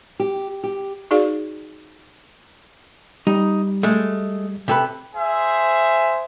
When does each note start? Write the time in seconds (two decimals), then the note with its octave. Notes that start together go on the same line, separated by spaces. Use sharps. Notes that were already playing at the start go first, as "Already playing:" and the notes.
0.20 G4
0.64 G4
1.11 D#4 F#4 G#4 D5 F5
3.27 G3 D#4
3.83 G#3 A3
4.68 C3 A4 B4
5.15 G#4 C5 E5